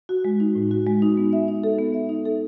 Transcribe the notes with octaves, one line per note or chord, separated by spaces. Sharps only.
F#4
G#3
D#4
A2
F#4
G#3
D#4
B3
E5
D#4
A4
B3
E5
D#4
A4